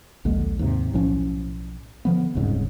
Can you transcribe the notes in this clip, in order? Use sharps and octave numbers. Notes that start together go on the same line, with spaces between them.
A#1 D#2 D3 G#3
D#2 G#2 C3
B1 A2 F3 C#4
D3 F3 B3
D#1 C2 G#2 C#3